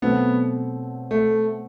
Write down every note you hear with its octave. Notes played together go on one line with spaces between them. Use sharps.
B2 F#3 A3 B3 C4
A3